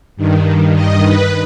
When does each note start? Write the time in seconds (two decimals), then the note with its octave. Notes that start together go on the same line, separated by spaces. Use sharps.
0.16 G2 D#3
0.75 D#5
1.04 B4